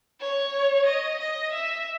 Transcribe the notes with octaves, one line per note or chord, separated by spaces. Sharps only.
C#5
D#5
D#5
E5